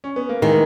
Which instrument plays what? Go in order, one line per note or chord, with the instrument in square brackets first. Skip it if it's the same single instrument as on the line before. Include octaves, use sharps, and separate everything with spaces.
[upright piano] C#4
B3
A#3
[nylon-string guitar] D#3 [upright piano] E3 G#3